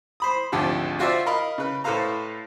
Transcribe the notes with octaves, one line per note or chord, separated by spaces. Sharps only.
C5 B5 D#6
G#1 D2 D3 F3 G4
F4 F#4 C5 D5 E5
A#4 D#5 F5 B5
C#3 B4
A2 A4 B4 C5 F5 A#5